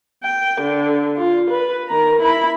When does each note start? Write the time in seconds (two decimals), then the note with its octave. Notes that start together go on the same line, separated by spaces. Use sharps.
0.23 G5
0.61 D3
1.17 F4
1.50 B4
1.89 D#3 A#5
2.22 E4 B5